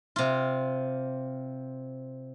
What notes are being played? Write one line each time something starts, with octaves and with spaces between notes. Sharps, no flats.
C3 F4